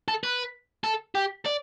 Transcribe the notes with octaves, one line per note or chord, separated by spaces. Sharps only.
A4
B4
A4
G4
D5